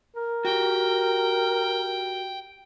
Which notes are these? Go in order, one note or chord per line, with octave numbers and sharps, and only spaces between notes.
A#4
F#4 G4 G5